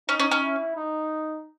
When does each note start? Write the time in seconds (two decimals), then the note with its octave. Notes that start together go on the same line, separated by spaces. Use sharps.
0.09 C#4 D#4
0.20 C#4
0.31 C#4
0.42 E4
0.76 D#4